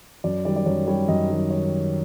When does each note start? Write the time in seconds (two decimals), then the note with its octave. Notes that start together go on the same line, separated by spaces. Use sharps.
0.24 F#2 D5
0.45 D#3 G3 D5
0.56 D5
0.66 F#2 C#5
0.87 D#3 G3 C#5
1.08 F#2 D#5
1.29 D#3 G3
1.51 C#5